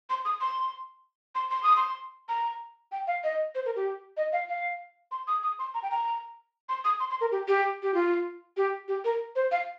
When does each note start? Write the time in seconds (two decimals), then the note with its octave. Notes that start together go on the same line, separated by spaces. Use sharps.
0.10 C6
0.25 D#6
0.41 C6
1.35 C6
1.51 C6
1.63 D#6
1.77 C6
2.29 A#5
2.92 G5
3.07 F5
3.24 D#5
3.55 C5
3.65 A#4
3.76 G4
4.17 D#5
4.33 F5
4.49 F5
5.11 C6
5.28 D#6
5.43 D#6
5.59 C6
5.74 A#5
5.83 G5
5.91 A#5
6.69 C6
6.85 D#6
7.00 C6
7.10 C6
7.21 A#4
7.32 G4
7.48 G4
7.83 G4
7.94 F4
8.57 G4
8.88 G4
9.05 A#4
9.36 C5
9.52 F5